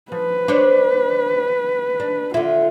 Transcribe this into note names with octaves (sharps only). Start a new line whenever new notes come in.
F3 B4
D4 C5 C#5
D4
D3 E4 F4